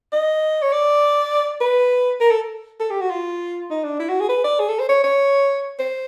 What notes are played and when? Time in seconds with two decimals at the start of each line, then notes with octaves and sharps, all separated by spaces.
0.13 D#5
0.62 C#5
0.73 D5
1.61 B4
2.20 A#4
2.31 A4
2.80 A4
2.91 G4
3.01 F#4
3.11 F4
3.71 D#4
3.84 D4
4.00 E4
4.09 F#4
4.20 G#4
4.29 B4
4.44 D5
4.60 G#4
4.69 A4
4.80 C5
4.89 C#5
5.04 C#5
5.79 C5